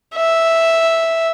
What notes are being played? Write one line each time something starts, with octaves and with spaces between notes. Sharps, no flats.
E5